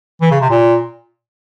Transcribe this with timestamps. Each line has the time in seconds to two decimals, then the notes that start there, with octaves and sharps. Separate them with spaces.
0.21 E3
0.31 C#3
0.41 C3
0.50 A#2